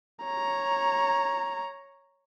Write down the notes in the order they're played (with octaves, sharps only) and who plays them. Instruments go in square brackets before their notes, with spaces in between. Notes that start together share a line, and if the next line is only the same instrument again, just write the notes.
[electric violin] C#5 A#5